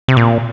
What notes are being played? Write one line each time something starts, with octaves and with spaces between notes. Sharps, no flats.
C3
A#2